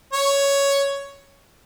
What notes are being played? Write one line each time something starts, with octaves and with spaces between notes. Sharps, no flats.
C#5